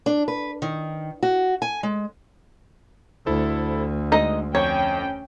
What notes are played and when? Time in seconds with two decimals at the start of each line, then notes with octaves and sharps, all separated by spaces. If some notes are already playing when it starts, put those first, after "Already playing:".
0.06 D4
0.28 B4
0.62 D#3
1.23 F#4
1.62 G#5
1.83 G#3
3.26 D2 E4 A4 C5
4.12 G#3 D#4 D#5
4.55 F2 C#4 C#5 G5